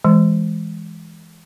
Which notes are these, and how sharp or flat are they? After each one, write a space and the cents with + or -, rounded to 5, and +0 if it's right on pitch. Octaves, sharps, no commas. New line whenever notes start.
E3 +0 G#3 +0